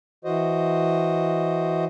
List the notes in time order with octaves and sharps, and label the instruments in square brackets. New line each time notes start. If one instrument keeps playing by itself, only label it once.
[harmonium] E3 F#4 C5 D#5